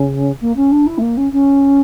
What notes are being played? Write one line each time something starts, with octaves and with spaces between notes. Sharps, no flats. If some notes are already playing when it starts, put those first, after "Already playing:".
Already playing: C#3
A#3
C#4
D4
E4
A3
A#3
C#4
C#4